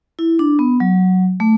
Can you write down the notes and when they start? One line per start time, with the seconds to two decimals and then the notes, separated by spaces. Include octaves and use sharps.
0.19 E4
0.39 D4
0.59 B3
0.80 F#3
1.40 A3